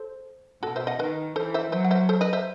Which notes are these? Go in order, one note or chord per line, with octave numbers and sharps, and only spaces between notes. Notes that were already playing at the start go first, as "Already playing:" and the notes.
Already playing: A4 C5
B2 F#4 A4
C5 E5
D#5 F#5
D#3 B4 D#5
E3 A4 C5
C5 E5
F#3 C5 E5
F#5
C5 E5
A4 C5
B4 D#5
C5 E5